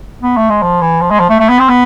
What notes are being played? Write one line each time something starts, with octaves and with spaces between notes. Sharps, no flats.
B3
A3
G#3
F3
E3
F3
G#3
F3
A3
A3
B3
C4
B3